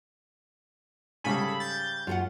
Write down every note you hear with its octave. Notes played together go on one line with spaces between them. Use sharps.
G#2 C#3 G3 G#4 A4 B5
G6 A6
F#2 F4 A4 F#5